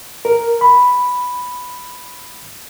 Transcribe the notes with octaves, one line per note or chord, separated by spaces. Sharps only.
A#4
B5